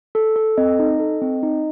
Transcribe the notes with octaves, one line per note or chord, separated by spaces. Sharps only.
A4
A4
C4 D#5
D#4
A4
C4
D#4